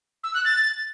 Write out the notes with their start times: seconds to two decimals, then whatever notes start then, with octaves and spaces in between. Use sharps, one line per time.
0.23 E6
0.34 F#6
0.45 A6